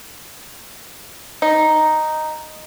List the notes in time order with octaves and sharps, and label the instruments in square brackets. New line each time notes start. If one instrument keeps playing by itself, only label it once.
[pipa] D#4